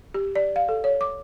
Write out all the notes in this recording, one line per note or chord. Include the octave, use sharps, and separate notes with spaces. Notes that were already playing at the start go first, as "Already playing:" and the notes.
G4
D5
F5
A4
C#5
D6